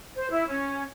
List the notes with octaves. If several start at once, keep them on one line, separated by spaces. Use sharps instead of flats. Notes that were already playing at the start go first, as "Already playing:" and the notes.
C5
E4
C#4